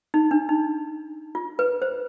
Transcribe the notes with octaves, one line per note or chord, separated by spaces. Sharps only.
D#4
D4
D#4
F4
B4
C5